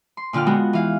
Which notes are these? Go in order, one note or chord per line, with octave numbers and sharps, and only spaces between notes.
C6
A#2 D3 F4 G5 F6
G#3 B3 F#4
E3 F5